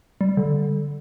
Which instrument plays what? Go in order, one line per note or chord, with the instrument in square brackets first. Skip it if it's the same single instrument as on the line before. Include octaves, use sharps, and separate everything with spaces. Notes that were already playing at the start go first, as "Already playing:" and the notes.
[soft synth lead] G3
D3